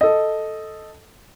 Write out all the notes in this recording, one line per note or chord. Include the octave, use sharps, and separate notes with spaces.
A4 D#5